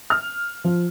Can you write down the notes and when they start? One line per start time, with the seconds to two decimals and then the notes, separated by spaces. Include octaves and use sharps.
0.10 F6
0.64 F3